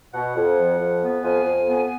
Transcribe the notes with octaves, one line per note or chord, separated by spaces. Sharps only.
B2 F#5
F2
F3
F2
B3
F2 G#5
F2
B3